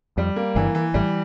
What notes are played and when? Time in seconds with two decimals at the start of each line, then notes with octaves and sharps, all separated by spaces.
0.17 F2 G3
0.36 A#3
0.55 G1 G2 E3
0.75 E3
0.94 A1 A2 G3